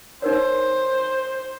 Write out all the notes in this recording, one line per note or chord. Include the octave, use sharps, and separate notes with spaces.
D#4 A#4 C5 C#5